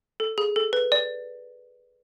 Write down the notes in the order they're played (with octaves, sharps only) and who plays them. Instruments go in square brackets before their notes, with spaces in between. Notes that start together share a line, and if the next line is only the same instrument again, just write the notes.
[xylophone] A4
G#4
A4
B4
D5